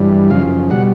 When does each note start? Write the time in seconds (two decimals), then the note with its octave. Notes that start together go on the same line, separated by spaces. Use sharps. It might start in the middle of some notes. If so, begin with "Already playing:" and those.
Already playing: G2 E3 G3
0.30 F#2 C#3 F3 F5
0.70 B2 G3 F#5